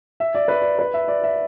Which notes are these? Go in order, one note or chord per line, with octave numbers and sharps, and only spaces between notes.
E5
D5
B4
D5
B4
E5
D5
E5